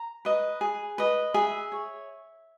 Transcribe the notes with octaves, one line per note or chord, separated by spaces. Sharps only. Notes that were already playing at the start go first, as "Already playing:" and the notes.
Already playing: A#5
B4 D#5
G#4
B4 D#5
G#4 E5
C#5